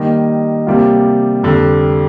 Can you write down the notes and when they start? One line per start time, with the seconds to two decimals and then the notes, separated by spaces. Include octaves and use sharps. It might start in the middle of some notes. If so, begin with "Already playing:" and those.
Already playing: D#3 G3 A#3 D#4
0.67 C3 G3 A#3 F4
1.43 F2 D3 G3